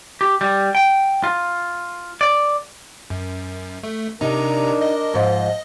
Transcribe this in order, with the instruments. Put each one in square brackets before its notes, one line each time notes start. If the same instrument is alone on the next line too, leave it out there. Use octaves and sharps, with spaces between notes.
[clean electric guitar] G4
G3
G5
F4
D5
[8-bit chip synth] F#2
A3
[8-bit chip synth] C3 A#5 [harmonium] D4 A#4 [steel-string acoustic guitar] D#4
[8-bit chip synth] D#5
[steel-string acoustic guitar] G#2 F3